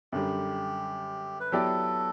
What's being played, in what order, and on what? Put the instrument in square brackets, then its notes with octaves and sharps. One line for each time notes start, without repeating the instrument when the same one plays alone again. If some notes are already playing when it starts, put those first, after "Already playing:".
[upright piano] F#2 D3 G3 [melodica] G4
[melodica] B4
[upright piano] F#3 B3 E4 G4 D5 [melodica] A4